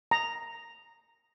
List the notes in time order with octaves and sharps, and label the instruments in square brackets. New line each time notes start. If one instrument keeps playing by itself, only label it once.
[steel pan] A#5